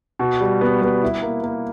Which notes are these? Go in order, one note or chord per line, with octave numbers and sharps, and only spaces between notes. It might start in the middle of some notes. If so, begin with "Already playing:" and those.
B2
G3
B3
B3
E4
A#3
A#3